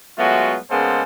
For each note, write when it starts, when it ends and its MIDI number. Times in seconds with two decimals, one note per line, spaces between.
0.18 0.57 54
0.18 0.57 56
0.18 0.57 57
0.18 0.57 59
0.18 0.57 65
0.18 0.57 66
0.70 1.03 49
0.70 1.03 56
0.70 1.03 58
0.70 1.03 59
0.70 1.03 69
0.70 1.03 72